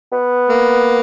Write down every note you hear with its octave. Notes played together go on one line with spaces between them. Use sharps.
B3
A#3